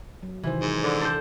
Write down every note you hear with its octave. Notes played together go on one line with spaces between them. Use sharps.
F#3
C3 D#3 E3 C5
G#2
D3
A4 C5 G6